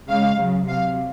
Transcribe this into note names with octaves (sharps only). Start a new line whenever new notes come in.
C#3 G#3 F5
C#3 F#3
C3 F#3 F5